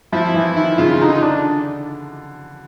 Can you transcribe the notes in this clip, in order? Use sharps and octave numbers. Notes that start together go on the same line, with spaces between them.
F3 E4
E3
D#3 E4
C#3 F4
D3 D#4
D4